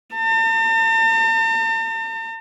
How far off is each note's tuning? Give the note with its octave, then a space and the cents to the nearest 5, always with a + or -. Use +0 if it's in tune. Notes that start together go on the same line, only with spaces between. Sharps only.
A5 +45